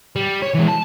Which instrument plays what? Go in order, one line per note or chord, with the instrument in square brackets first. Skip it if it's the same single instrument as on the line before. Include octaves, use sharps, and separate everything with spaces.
[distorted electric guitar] G3
C#5
E3 G#3
A5